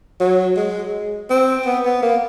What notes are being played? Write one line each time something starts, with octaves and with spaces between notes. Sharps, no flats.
F#3
G#3
C4
B3
B3
A#3